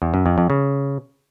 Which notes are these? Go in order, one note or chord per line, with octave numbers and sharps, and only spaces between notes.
E2
F#2
F2
F2
C#3